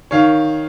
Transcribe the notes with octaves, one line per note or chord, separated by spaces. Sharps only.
D#3 C#5 F5